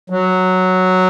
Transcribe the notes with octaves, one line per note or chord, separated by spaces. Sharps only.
F#3